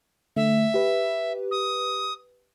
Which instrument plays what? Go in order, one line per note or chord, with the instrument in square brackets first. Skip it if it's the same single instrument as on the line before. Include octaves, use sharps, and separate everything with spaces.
[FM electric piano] D3 A3 [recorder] E5
[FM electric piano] G4 B4
[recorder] D#6